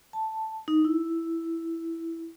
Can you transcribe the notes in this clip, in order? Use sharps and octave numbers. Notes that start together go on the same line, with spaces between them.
A5
D#4
E4